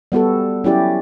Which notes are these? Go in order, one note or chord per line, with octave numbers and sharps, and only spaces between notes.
G3 B3 F#4 A4
F#3 C#4 E4 G4 D5